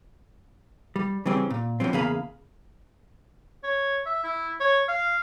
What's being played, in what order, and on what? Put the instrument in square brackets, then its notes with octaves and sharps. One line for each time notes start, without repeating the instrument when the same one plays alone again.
[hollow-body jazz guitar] G3
C#3 E3 G3 C4 C#4
A#2
B2 D3 F3 F#3 C4
E2 C#3 A#3 G#4 F5 B5
[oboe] C#5
E5
E4
C#5
F5